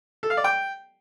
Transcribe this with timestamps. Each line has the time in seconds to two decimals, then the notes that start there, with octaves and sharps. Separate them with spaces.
0.23 A4
0.30 F5
0.37 D5
0.44 G5